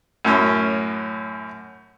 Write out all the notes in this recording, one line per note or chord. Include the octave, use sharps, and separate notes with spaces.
F#2 A2 C#4